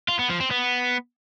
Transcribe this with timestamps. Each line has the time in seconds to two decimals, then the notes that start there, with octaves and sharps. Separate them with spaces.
0.08 F4
0.19 B3
0.30 F3
0.40 C4
0.51 B3